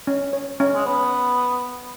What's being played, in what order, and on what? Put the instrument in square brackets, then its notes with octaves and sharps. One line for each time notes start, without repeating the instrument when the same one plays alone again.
[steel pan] C#4
C#5
C#4
[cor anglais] G#3
[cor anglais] B3 [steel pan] C#5